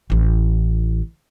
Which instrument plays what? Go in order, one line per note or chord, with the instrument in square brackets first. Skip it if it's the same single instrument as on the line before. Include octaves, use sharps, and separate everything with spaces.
[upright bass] A1 E3